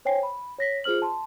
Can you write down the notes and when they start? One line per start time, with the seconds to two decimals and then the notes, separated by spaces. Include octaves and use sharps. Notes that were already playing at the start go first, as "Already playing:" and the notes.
0.05 C5 C#5 G5 G#5 C7
0.23 B5
0.59 C#5 A#6 B6
0.84 F4 G#4 C5 F6 F#7
1.02 A5 C6